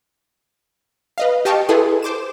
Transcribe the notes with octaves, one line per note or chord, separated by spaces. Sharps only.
B4 D#5 F5
G4 D#5 F5 G5 A5 C#6
E4 G#4 A4 B4 C6 D#6
C5 D6 E7